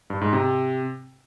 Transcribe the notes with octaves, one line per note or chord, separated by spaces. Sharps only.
G2
G#2
C3